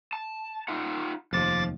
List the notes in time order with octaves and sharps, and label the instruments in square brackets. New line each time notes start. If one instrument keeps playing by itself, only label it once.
[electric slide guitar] A5
D#4 F4 F#5
[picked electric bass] F1 D#2 [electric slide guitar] F3 [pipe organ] D6 A6